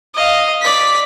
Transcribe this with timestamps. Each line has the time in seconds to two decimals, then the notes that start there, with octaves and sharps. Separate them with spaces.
0.15 D#5 F5
0.61 D5 B6